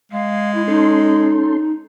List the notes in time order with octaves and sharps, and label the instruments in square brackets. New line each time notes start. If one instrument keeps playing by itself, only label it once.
[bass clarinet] G#3 [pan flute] F5
[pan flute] E4
[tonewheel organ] C#4 A4 C6 [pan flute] D#4